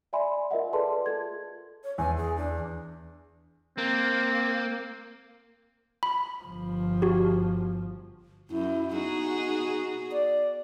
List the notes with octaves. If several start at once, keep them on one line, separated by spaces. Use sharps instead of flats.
D5 E5 G#5 B5 C6
F4 A#4 D#5 E5 F#5
G#4 A4 B4 D5 A5 C6
F4 A4 G#6
C#5
E2 G#5
G#4
D4
A#3 C4
B5
G1 F3
F#4 G4
F#2 E4
B3 D#4 F#4 G#4
D5